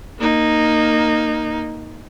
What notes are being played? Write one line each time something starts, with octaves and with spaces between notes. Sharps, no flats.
A#3 D#4